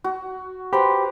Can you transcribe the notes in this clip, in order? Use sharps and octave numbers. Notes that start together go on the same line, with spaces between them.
F#4
G4 B4 C5 A#5